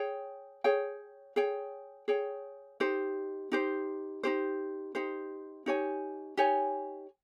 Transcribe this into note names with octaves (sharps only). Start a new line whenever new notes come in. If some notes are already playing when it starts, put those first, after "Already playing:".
Already playing: G#4 C#5 G5
G#4 C#5 G5
G#4 C#5 G5
G#4 C#5 G5
D#4 G4 C5
D#4 G4 C5
D#4 G4 C5
D#4 G4 C5
D#4 G4 C#5 G#5
D#4 G4 C#5 G#5